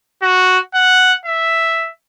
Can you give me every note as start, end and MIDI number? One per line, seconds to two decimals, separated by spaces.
0.22 0.59 66
0.75 1.14 78
1.26 1.90 76